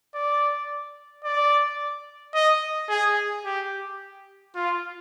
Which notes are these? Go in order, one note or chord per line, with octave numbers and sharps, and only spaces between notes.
D5
D5
D#5
G#4
G4
F4